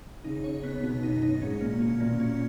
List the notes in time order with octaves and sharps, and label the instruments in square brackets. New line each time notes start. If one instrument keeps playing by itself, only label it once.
[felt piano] C#3 [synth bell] D#4
[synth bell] C#5
B3
[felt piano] B2 [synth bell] B3
[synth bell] D#4
[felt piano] F#2
[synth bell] D#4
[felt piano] G#2 [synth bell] C#4
[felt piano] A#2 [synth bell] A#3
[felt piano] B2 [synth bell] C#4
[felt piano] A#2 [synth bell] A#3
[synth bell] C#4